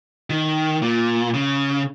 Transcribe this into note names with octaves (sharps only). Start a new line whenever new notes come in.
D#3
A#2
C#3